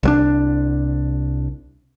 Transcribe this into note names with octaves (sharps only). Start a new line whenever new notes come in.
C2 F#3 D4